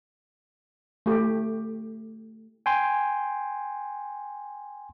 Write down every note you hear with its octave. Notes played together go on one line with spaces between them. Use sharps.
A3 G4
G5 G#5 C6